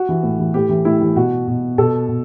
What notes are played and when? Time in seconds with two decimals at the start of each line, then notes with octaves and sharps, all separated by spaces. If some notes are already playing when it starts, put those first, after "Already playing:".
Already playing: F#4
0.09 E3
0.23 A2
0.39 E3
0.54 A2 G4
0.69 E3
0.85 A2 E4
1.01 E3
1.16 B2 F#4
1.48 B2
1.78 B2 A4
2.09 B2